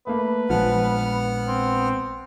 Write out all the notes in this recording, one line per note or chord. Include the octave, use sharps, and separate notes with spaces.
A3 A#3 B4
A#1 F3 G#3 B3 F#5 F6
C4